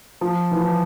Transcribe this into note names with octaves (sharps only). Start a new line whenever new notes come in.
F3
E3
F3